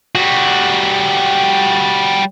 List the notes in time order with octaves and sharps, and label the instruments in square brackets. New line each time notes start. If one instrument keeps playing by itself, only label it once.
[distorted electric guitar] G3 F#4